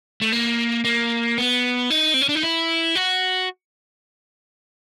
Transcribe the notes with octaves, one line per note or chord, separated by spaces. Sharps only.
A3
A#3
A#3
B3
D#4
C4
C#4
D4
D#4
E4
F#4